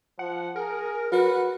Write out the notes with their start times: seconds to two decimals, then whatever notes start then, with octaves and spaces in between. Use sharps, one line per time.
0.19 F3 F#5
0.56 G#4 A#4
1.12 F#4 B4